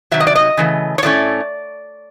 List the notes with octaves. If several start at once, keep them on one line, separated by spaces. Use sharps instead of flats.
C3 D#3 F#3 E5
D#5
D5
D#5
C#3 E3 A3
C#5
A2 F#3 A3 C#4 E4 D5